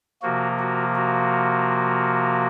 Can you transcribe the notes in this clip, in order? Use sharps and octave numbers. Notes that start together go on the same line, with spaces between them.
C3 F3 A#3 F#4
F#4
F#4